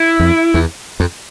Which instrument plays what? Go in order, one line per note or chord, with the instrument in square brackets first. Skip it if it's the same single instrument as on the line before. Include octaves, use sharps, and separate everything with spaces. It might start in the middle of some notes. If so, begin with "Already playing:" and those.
Already playing: [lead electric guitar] E4
[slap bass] F2
E2
F2